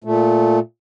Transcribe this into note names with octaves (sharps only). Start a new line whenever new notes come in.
A#2 A3